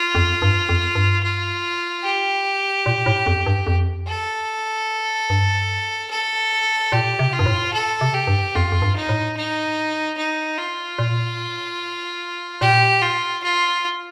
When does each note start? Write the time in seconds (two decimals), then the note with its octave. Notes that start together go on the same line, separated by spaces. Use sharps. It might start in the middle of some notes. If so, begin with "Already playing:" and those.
Already playing: F4
0.15 F2
0.42 G2
0.69 F2
0.95 G2
1.23 F4
2.04 G4
2.86 A#2
3.06 A2
3.26 F2
3.46 G2
3.67 F2
4.08 A4
5.30 G2
6.10 A4
6.92 A#2 G4
7.19 C3
7.33 F4
7.39 G2
7.46 A2
7.74 A4
8.01 C3
8.14 G4
8.27 G2
8.55 F2 F4
8.72 F2
8.82 G2
8.96 D#4
9.09 A2
9.37 D#4
10.17 D#4
10.58 F4
10.98 A#2
12.61 A#2 G4
13.02 F4
13.43 F4